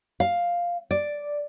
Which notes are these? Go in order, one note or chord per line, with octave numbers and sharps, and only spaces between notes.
F5
D5